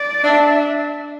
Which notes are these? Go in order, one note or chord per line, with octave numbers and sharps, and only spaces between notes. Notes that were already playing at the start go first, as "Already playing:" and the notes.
Already playing: D5
D4 E5